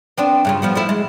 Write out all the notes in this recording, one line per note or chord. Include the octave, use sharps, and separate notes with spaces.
B3 C4 D4
G2 C#3 F4
F3 B3 F#4
F3 A3 E4
G#3